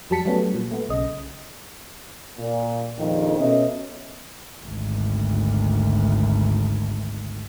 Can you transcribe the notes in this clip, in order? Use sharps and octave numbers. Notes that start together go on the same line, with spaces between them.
F2 F#3 G3 A5 B6 C#7
F#3 G3 A3 B3 C#4
A#2
A3 B3
B1 C#3 D#5
A#2
A#1 F2 D#3
B2 C#4 A4 C#5 D#5 E5
G#1 D2